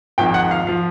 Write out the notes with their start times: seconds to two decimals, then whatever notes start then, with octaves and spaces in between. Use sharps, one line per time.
0.18 G#1 G#2 F3 G5
0.34 F#5
0.51 F5
0.67 F3 F5